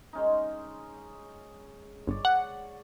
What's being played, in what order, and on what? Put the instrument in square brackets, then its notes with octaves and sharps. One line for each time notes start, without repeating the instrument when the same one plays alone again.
[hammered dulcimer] G#3 C#4 D#4
[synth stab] G1 [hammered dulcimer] C#5 D5
[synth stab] F#5